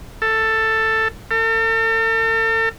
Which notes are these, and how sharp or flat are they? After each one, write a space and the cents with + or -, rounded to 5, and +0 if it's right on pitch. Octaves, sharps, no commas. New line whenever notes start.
A4 +10
A4 +40